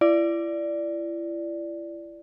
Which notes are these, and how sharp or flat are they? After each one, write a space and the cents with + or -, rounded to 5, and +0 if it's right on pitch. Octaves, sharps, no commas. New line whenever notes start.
E4 +35 D5 +0